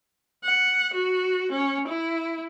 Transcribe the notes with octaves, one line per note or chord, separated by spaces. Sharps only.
F#5
F#4
C#4
E4